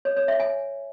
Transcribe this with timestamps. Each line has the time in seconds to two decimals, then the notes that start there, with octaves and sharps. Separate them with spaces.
0.05 C#5
0.17 C#5
0.28 E5
0.40 G#5